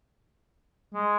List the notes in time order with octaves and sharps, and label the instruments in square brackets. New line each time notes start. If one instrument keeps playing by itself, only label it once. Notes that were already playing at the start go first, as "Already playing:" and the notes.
[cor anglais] G#3